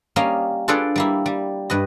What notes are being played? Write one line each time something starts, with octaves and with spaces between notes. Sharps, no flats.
G3 A#3 C#4 D#5 F5
D4 F4 G#4 A4 B4 D5
G3 A#3 E4
G3
G2 B4 D#5